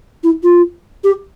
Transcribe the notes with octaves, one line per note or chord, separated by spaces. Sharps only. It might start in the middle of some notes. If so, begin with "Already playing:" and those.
E4
F4
G4